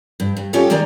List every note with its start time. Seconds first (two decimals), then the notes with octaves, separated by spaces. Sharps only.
0.20 G2
0.37 G2
0.53 C#4 F4 G4 A4 C#5 D#5
0.70 D#3 G#3 A#3 D#4 D5 A#5